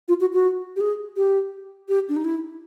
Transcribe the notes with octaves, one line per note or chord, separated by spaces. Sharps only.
F4
F#4
F#4
G4
G#4
G4
G4
D4
D#4
E4